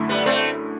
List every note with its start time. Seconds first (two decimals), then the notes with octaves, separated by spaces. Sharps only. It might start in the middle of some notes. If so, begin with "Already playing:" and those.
Already playing: F#2 D3 A3 E4
0.09 G3 B3
0.26 A3 C4